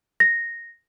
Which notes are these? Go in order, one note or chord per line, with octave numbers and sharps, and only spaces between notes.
A#6